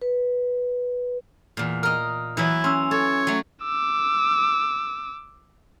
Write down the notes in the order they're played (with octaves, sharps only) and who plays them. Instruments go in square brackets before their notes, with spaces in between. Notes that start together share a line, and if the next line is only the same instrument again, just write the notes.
[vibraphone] B4
[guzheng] E2 A#2
[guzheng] A#4 D#5 [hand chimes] D#6 F6
[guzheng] E3 F#3 B4 [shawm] E4
[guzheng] C#4 [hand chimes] C6 E6
[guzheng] A4 [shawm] C#5
[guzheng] F#3 A3
[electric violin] D6 E6